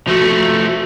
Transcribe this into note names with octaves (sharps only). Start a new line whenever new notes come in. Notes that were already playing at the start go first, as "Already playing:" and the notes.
F3 A3 F#4